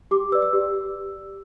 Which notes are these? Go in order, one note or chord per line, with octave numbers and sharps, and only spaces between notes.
G4 D6
B4 D5 E6
E6
G4